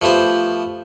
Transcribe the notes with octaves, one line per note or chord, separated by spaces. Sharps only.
F3 A3 B3 G4 C5